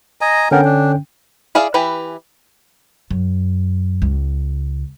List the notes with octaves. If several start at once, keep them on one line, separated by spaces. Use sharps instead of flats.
D#5 G#5 A#5
D3 B3 C#4 A#4 G5
D4
E4 G#4 D5 E5 F5
E3 E4 G4 B4 G#5
F#2
C#2